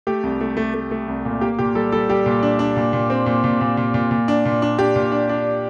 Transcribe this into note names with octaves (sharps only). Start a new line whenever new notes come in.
A3 G4
C2
A3
A3
A3
A3
C2
A#2
A#3 G4
A#2 G4
G3 A4
G3 A4
G3 G4
A#2
D4
D4
A#2
A#2
C4
A#2
A#2
A#2
A#2
A#2
A#2
D4
A#2
D4
D4 G4
A#2
D4
D4